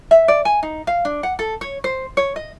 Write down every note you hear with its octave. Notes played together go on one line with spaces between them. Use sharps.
E5
D5
G#5
D#4
F5
D4
F#5
A4
C#5
C5
C#5
D#5